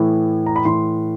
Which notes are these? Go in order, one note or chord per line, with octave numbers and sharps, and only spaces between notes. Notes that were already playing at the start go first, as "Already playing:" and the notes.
Already playing: A2 E3
A#5
B5
A2 E3 C6